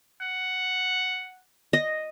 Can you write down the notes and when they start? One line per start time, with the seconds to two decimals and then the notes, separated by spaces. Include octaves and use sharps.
0.21 F#5
1.73 D#5